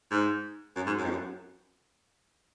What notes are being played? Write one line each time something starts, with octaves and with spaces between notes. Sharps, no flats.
G#2
F#2
G#2
F#2
F2
F#2